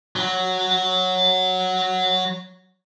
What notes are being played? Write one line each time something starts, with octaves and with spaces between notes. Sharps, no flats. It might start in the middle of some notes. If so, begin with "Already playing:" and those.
F#3 F#4